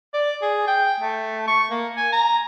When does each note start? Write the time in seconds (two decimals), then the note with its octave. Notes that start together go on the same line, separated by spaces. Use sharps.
0.14 D5
0.42 G#4
0.68 G5
1.00 A3
1.48 C#6
1.71 A#3
1.97 G#5
2.12 A#5